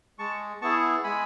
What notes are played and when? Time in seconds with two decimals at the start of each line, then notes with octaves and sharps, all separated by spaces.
0.18 G#3 A5 C#6
0.61 B3 E4 G#4 A5 C#6
1.04 G#3 G#5 B5